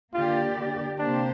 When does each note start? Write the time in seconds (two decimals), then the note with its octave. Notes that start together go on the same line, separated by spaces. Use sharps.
0.13 D3 A#3 F4 G4 D5
0.98 C3 A#3 D4 G4 C5